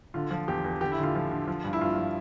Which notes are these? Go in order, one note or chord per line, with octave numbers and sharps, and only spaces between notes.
D3 F4
F3
E2 G4
E2
D3 G4
E4
D3
F4
F3
D3
F3
G2
E4
G2 F4
F3